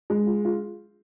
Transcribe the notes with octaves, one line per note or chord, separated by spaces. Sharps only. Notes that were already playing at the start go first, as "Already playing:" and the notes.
G#3
F4
F4